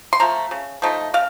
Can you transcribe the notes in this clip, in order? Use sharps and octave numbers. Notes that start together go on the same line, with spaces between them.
C6
F3 A3 A#5
C#3
F3 A3 D#4
C#3 F5